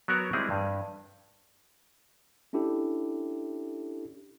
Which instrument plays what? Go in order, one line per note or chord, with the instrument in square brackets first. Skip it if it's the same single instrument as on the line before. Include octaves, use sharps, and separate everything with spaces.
[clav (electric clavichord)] F#3 B3 F#4 A#4 C#5
G3 G#3 C4 E4 G#4
G2
[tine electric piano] C#4 D4 E4 G4 A4